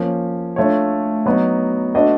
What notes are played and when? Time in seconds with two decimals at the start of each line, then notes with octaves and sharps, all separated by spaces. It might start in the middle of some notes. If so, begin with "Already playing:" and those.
Already playing: F3 A#3 C#4
0.56 A3 D4 F4 A4 C#5
1.26 F#3 B3 D#4
1.95 A3 D4 F#4 B4 D#5